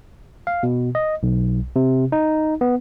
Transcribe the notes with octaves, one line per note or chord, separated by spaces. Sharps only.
F5
B2
D#5
B1
C3
D#4
B3